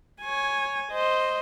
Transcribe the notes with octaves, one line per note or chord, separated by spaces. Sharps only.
C#5 G#5
C5 D#5